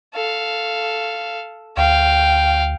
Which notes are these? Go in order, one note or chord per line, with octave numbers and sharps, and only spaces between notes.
A4 F5
D2 F5 G5